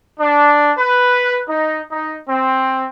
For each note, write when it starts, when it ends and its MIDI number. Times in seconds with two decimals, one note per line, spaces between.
0.18 0.70 62
0.77 1.38 71
1.46 1.79 63
1.90 2.15 63
2.27 2.84 60